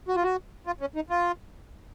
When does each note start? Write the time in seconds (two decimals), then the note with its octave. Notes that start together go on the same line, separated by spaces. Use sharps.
0.08 F#4
0.16 F4
0.23 F#4
0.67 F4
0.81 C#4
0.95 D#4
1.10 F4